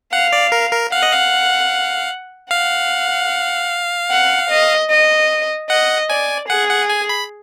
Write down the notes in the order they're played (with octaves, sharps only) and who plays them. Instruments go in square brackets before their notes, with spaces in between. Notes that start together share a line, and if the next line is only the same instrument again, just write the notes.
[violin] F5 [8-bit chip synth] F#5
[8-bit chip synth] D5
A#4
A#4
[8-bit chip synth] F5 [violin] F#5
[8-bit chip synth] D#5
F5
[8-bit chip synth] F5 [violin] F#5
[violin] F#5
D#5
D#5
[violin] D#5 [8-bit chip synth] F#5
[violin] D5 [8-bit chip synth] G#5
[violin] G#4 [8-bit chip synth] F#5
[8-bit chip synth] F#5
G#5
B5